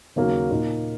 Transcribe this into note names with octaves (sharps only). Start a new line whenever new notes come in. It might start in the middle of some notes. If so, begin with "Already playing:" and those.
D#2 C#3 F#3 A#3
A#2 A#3 D#4